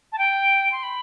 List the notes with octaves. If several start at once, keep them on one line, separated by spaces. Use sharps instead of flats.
A5
G5
C6
B5